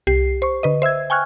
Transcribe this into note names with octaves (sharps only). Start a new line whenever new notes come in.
C2 G4 C7
C5 C#6
D3 B4 D#5
C5 E5 E6 G#6
G5 G#5 C#6 F6 F#6 G#6